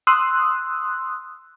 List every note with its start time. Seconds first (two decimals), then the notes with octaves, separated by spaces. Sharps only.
0.07 C6 D#6 E6 F#6